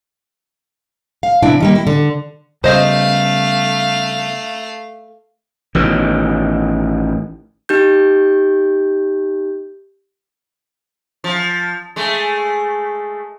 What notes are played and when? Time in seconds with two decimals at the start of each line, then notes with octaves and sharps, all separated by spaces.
1.23 F5
1.43 C3 E3 D4 E4
1.60 D#3 G3 A#3
1.75 E4
1.87 D3
2.64 C#3 G3 A3 B3 C5 D#5 F5
5.75 A1 B2 D#3
7.69 D#4 G4 G6
11.24 F3
11.96 G#3 A3